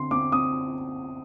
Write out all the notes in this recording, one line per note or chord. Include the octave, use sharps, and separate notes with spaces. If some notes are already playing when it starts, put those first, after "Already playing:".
Already playing: D3 C4 C6
C4 D6
C4 D#6